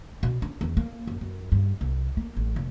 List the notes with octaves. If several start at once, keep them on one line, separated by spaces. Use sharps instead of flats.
B2
D4
E2
A#3
F#2
F#2
G2
C2
A#3
A1
F1